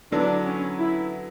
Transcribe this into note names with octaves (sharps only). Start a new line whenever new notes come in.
D3 F#3 B3 D4 E4
C#4
E4